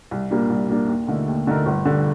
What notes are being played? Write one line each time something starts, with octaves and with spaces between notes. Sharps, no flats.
C2
A#2 G3 A#3 D4
C2
A#2 G3 A#3 D4
D#2
D3 A3 D#4 A#4
D#2
D3 A3 D#4 A#4
G1
G2 D3